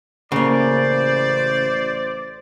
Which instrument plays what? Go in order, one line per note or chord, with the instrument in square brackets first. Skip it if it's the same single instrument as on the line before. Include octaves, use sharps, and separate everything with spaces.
[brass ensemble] A1 C5 D5 [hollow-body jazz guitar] C#3 A#3